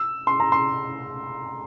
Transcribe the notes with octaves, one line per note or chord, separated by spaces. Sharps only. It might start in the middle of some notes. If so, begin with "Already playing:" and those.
Already playing: E6
C6
A#5
C6